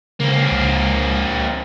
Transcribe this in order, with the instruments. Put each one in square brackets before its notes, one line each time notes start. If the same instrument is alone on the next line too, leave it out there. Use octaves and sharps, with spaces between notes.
[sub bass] C#3 [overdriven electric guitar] A#3 C4
[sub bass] C#2